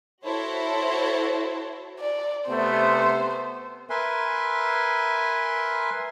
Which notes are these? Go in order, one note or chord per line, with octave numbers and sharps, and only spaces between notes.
E4 F#4 A4 C5 C#5
D5
C3 A3 B3 C5
A#4 B4 E5 G#5 C6